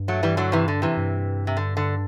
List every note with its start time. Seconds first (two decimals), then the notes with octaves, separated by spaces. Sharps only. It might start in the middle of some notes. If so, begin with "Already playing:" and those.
Already playing: G2
0.08 F#3 A3
0.23 E3 G3
0.37 D3 F#3
0.52 C3 E3
0.68 D3
0.82 C3 E3
0.97 G2
1.47 C3
1.57 D3
1.77 D3